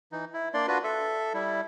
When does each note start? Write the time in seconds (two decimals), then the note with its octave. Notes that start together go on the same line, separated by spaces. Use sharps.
0.12 E3 D#4
0.33 E4
0.54 A#3 D4 D5 C6
0.68 D4 F4 F#4 B4
0.84 A4 E5
1.34 G3 E4